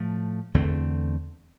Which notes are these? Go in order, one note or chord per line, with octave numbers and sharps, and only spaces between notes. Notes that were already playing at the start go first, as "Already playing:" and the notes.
Already playing: A2 F3 A3
E2 D3 A3 C4